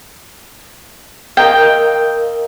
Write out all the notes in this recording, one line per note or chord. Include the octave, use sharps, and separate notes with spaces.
A#4 D#5 F5 G5